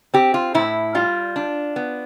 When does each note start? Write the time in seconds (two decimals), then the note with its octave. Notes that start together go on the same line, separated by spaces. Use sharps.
0.14 C4 G4
0.34 F4
0.54 A2 E4
0.95 G3 F4
1.36 D4
1.76 B3